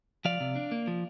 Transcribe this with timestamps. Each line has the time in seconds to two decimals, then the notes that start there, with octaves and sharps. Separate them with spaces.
0.25 F3 D5 F5
0.40 C3
0.56 D4
0.72 A#3
0.87 F3